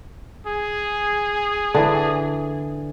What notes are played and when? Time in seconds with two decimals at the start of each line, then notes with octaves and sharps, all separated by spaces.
0.47 G#4
1.74 D3 E3